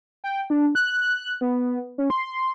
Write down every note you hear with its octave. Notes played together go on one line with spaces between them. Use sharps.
G5
D4
F#6
B3
C#4
C6